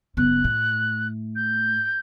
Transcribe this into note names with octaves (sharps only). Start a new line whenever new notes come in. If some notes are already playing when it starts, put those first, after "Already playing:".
F#1 B3 F#6
A2
G6